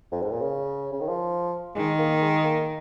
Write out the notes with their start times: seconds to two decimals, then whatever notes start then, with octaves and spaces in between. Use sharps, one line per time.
0.12 F2
0.22 G#2
0.31 A#2
0.42 C#3
0.92 C#3
1.00 D#3
1.08 F3
1.76 D#3 G#3
1.99 A#3
2.21 G#3
2.44 A#3